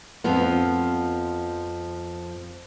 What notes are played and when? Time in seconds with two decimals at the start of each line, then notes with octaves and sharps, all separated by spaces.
0.24 F2 F3 B3